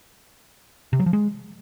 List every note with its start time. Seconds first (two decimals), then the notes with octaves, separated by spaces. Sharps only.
0.93 C3
1.00 F#3
1.06 F3
1.13 G#3